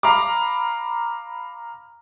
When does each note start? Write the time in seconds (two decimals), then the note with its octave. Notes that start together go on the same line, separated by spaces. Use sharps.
0.03 F5 A#5 B5 D6